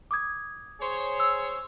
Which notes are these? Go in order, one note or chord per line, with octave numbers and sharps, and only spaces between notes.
D6 D#6 G#6
G#4 C5 C#5
E6